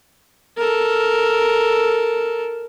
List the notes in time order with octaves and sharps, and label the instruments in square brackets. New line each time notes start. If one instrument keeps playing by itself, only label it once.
[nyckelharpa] A4 A#4